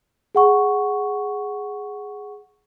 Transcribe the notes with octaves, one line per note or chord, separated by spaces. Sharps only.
G#4 F#5 C#6